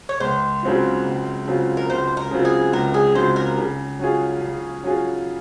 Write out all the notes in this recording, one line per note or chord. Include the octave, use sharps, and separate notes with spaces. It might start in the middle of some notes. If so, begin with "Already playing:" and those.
C#5
C#2 C5
C#3 F#3 C4 F4
C#2
C#3 F#3 C4 F4
A#4
C#2 C5
A#4
C#3 F#3 C4 F4
G#4
C#2 A#4
G#4
C#3 F#3 C4 F4 C5
A#4
C#3
F#3 C#4 F4 G#4
C#3
F#3 C#4 F4 G#4